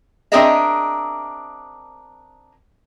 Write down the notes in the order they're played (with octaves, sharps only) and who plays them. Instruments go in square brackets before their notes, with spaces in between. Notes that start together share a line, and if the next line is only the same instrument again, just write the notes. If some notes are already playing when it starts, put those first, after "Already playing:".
[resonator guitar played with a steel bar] C4 D4 G#4 A#4 D#5 E5